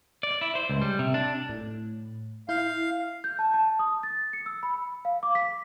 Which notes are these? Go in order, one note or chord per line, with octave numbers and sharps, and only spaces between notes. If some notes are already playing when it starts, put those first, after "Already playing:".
D5
E4
C5
C#2
G3
C3
D4
A2
E4 F5 G6
G6
A5
A5
D#6
A6
C#7
E6
B5
F5
D6
B6